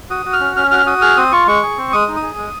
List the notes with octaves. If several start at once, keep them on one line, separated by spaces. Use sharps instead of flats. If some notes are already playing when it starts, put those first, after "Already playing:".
F#4 D#6
F#4
F6
C#4
C#4 F6
F#4 F6
F#4 D#6
G#4 F6
C4 D#6
F4 C#6
G#3 C#6
G#4
C4
G#3 D#6
D#4
D#6
G#4
G#3